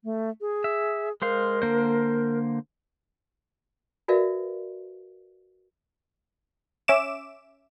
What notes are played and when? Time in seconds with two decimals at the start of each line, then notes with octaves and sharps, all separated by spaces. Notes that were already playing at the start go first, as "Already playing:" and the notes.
0.04 A3
0.41 G#4
0.64 E5
1.22 G#3 A#4 C5 F5
1.62 D3 A#3 C5
4.08 F#4 A#4 B4 D5 E5 F5
6.88 C#4 E5 D6 E7